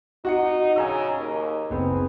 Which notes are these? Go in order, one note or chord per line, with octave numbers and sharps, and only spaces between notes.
D#4 F#4 F#5 C#7
C#3 G#5 A#5 E6
D#2
F#1 B3 C4 G#4